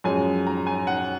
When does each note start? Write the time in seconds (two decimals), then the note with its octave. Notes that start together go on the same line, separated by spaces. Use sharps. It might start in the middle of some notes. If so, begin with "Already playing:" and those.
0.04 F#2 F3 G#3 G#5
0.47 A#5
0.67 G#5
0.87 F#5